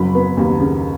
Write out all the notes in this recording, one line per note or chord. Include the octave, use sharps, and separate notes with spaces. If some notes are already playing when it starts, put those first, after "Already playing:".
Already playing: F#1 F#3 B5
B3
D#2
C#3